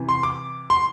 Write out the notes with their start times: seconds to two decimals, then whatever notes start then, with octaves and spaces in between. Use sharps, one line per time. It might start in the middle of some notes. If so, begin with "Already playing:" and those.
Already playing: C3 E3
0.09 C6
0.23 D6
0.70 C6